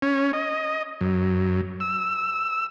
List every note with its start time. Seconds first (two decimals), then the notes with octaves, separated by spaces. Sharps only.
0.02 C#4
0.33 D#5
1.01 F#2
1.80 E6